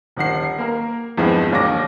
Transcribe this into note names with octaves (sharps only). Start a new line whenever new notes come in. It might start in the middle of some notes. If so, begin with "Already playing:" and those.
D#1 D#3 F#5 C7
A#3 A#4
E2 G2 E3 F3 G#3 C4
E1 D#2 D4 C#5 D6 A#6